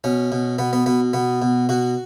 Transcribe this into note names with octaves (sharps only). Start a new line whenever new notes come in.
B2 C#4
B2
B2 B3
B3
B2 B3
B2 B3
B2
B2 F#4